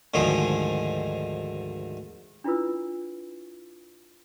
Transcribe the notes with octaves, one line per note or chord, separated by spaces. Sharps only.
D2 G#2 D#3 F3 G#4
D4 E4 F4 B4 E6